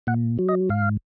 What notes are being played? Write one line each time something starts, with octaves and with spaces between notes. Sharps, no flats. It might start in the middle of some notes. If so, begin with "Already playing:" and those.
A#2 F#5
F#3
D#5
G#2 F5